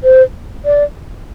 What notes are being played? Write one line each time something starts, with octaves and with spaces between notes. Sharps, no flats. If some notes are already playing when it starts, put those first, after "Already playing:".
C5
D5